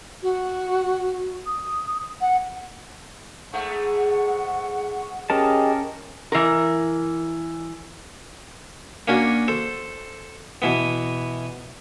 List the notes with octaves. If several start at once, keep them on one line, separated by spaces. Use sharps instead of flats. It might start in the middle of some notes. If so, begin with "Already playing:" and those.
F#4
D#6
F#5
G#2 G#3 A3 F#5 C#6
C#4 G4 G#4 A#4 D#5 A5
E3 A#4
A#3 C#4 D4 F#4
A4 C5
B2 E3 B3